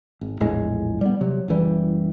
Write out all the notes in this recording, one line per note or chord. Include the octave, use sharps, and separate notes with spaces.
G#1
A#1 E2 A2 G#3
G3 B3
C3 F#3
F#1 C#2 E3 G3